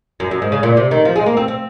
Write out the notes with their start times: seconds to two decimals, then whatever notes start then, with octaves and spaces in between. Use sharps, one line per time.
0.20 F#2
0.31 F#2
0.42 G#2
0.52 C#3
0.63 A#2
0.77 C3
0.91 D#3
1.05 F3
1.16 G#3
1.26 A#3
1.37 C4
1.48 C4